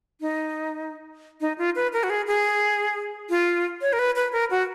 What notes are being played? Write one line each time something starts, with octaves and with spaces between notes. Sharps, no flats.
D#4
D#4
F4
B4
A#4
F#4
G#4
G#4
F4
C#5
A#4
B4
B4
A#4
F#4